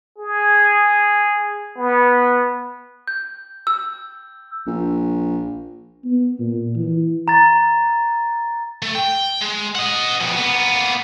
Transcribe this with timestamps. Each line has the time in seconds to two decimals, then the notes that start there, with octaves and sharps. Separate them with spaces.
0.18 G#4
1.78 B3
3.08 G6
3.67 E6
4.67 A#1
6.05 B3
6.39 A#2
6.76 E3
7.28 A#5 A6
8.82 A3
8.95 G5
9.42 G#3
9.75 D#5 F#5
10.21 F2 B2
10.38 A#3 B3